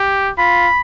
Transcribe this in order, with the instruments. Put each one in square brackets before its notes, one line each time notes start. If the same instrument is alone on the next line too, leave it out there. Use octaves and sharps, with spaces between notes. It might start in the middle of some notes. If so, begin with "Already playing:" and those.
Already playing: [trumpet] G4
[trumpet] F4 [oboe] B5